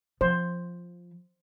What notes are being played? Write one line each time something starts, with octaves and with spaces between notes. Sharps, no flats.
F3 C5